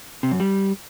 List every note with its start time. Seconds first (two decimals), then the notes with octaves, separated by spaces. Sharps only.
0.23 C3
0.32 F#2
0.40 G3